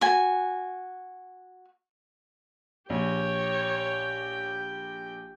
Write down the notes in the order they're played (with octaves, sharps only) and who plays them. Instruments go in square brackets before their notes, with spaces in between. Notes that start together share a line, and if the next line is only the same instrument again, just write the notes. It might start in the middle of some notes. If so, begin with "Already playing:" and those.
[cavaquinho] F#4 G#5
[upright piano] A#1 [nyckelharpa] G4 G5 [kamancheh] C#5